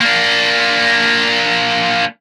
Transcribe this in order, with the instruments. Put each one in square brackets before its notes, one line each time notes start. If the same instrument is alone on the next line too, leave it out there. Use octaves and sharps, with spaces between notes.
[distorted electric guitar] A#3 D4